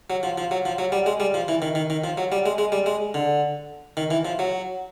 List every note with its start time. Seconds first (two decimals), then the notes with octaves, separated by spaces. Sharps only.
0.10 F#3
0.23 F3
0.38 F3
0.51 F#3
0.65 F3
0.79 F#3
0.92 G3
1.06 G#3
1.20 G3
1.34 F3
1.48 E3
1.62 D#3
1.75 D#3
1.90 D#3
2.04 F3
2.18 F#3
2.32 G3
2.46 G#3
2.58 G#3
2.72 G3
2.86 G#3
3.14 D3
3.97 D#3
4.11 E3
4.25 F3
4.39 F#3